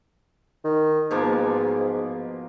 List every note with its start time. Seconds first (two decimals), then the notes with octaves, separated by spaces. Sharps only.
0.64 D#3
1.11 G#2 B2 F3 A#3